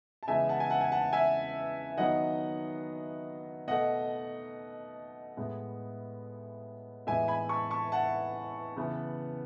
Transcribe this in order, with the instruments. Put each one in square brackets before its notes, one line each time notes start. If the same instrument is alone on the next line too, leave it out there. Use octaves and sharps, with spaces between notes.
[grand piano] A5
C#3 E3 G#3 B3 E5 G#5
F#5 A5
G#5
F#5 A5
G#5
F#5 A5
E5 G#5
D#3 F#3 B3 D#5 F#5
B2 A3 D#5 F#5
A2 G#3 B3
A2 E3 G#3 B3 E5 G#5
G#5 B5
A5 C#6
A5 C#6
F#5 A5
C#3 E3 B3